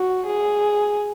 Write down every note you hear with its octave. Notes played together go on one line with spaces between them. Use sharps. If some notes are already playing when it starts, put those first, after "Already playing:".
Already playing: F#4
G#4